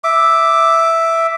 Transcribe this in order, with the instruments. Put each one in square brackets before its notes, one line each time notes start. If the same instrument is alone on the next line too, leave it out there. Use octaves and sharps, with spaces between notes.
[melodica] E5 D6